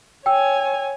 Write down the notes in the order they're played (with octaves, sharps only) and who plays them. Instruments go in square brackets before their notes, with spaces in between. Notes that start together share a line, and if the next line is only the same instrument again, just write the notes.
[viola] C#5 G#5 [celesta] G5 E6